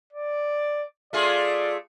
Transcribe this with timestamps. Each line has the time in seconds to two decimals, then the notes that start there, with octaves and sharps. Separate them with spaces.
0.13 D5
1.13 A3 F4 G#4 D5